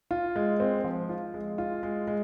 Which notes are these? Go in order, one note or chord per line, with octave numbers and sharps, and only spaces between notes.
F4
G#3
C4
F3
F4
G#3
F4
G#3
G#3